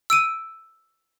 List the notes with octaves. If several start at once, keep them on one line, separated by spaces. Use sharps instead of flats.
E6 D7 D#7